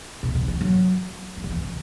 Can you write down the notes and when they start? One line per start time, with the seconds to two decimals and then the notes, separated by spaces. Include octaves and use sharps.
0.23 B2
0.35 D3
0.48 E3
0.61 F#3
1.37 F#3
1.44 D3
1.51 E3
1.63 C#3